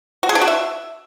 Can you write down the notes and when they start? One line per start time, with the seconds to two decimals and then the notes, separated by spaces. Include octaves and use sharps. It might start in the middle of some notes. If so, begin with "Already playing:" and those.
0.23 F#4
0.29 G#4
0.35 D4
0.41 F#4
0.48 E5